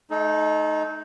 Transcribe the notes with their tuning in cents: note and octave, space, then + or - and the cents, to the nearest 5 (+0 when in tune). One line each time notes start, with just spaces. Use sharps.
A3 -40 D#4 +0 A4 -40